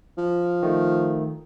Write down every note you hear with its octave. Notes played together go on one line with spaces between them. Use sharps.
F3
D#3 A3